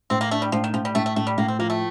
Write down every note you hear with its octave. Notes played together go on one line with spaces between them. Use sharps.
A2 C4
A#3
A3 D4
G3
A2 F3
D#3
A2 F3
G3
A2 A3
A3
A2 A3
G3
A2 A#3
C4
F3 A#3
A3